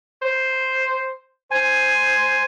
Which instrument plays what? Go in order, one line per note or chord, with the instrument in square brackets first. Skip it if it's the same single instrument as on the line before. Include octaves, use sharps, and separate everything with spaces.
[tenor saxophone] C5
[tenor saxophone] C5 [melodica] G#5